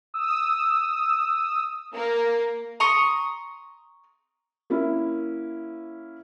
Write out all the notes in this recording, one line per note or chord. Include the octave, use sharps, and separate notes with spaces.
D#6 E6
A#3
A#5 C6 C#6 D#6
A#3 C#4 E4 E5